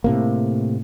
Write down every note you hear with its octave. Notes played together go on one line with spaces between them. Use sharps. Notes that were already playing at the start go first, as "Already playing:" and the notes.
A2 C3 A#3